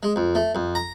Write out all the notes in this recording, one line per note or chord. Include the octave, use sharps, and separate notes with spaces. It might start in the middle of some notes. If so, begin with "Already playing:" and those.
G#3
F2
A3
F2
A#5